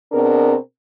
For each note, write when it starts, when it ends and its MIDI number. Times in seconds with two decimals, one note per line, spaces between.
0.12 0.54 47
0.12 0.54 60
0.12 0.54 62
0.12 0.54 68
0.12 0.54 70